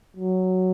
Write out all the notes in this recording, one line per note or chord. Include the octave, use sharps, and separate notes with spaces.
F#3